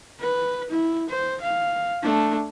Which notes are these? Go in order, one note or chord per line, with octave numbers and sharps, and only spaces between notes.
B4
E4
C5
F5
A3 D4